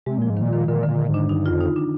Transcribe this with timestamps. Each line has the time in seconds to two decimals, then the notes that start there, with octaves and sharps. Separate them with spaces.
0.06 C3 G#3
0.18 A#2 F3
0.30 G#2
0.37 A#2 D#3
0.52 D#3
0.68 A#2 D3
0.83 A#2 D3
0.99 D#3
1.09 G#2
1.14 D4
1.29 G2 D#4
1.46 F2 F4
1.60 D#4
1.76 D4